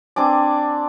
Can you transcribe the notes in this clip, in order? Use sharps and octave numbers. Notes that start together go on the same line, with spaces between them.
C4 D4 G#5 D6